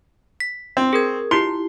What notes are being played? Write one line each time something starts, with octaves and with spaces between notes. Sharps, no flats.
B6
C4
G#4 A#4 G#6
E4 F4 G4 C6